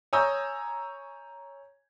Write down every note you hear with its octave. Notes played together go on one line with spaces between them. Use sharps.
C#5 G#5 A#5 D#6 E6 G6